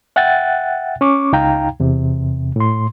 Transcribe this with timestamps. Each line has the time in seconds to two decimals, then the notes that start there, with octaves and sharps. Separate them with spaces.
0.16 E5 F#5 G5 F#6 A6
1.01 C#4 C#6 D6
1.33 C#2 D#4 F5 G5 A#5
1.80 E2 C3
2.56 A2 C6